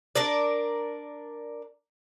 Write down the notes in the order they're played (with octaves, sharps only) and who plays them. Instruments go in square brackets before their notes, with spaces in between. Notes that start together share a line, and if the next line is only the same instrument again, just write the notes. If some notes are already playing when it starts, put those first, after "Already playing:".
[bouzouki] D4 A#4 D5